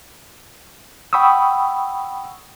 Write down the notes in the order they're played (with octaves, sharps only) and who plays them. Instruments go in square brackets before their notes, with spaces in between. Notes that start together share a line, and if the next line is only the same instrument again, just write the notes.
[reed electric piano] F#5 G5 B5 C#6 D#6 E6